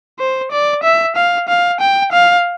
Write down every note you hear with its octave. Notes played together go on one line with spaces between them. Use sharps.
C5
D5
E5
F5
F5
G5
F5